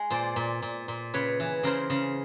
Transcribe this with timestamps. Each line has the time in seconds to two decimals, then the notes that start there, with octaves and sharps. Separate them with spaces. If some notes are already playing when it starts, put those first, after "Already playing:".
Already playing: G#3
0.10 A#2 C5 D5
0.36 A#2
0.62 A#2
0.88 A#2
1.14 C#3 B4 C#5
1.40 E3
1.63 C#3 A#4 C5
1.90 C#3